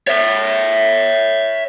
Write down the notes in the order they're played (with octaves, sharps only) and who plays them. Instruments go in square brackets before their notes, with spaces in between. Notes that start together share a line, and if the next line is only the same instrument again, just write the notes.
[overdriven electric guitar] C#5 E5